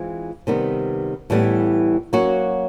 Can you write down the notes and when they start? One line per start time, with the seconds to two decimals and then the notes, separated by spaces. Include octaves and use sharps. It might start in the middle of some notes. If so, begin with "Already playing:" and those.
Already playing: E3 G#3 C4 F4 G#4
0.47 C3 D#3 G3 B3
1.30 A2 E3 G3 B3
2.13 F#3 A#3 C#4 F#4